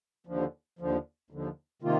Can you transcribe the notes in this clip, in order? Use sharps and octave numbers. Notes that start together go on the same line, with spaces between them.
D#2 D3 F3
D#2 D3 F3
D#2 D3 F3
C3 D#3 A#3 F4